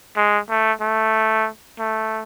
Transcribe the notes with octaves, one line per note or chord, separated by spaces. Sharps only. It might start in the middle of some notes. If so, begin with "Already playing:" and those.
G#3
A3
A3
A3